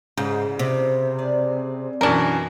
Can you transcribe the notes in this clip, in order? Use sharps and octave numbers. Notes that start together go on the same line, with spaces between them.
G#2 C#3 E3 F3 G3
C3
D4 G#4 D5
F#2 B2 D#3 E3 C4 D4 A#4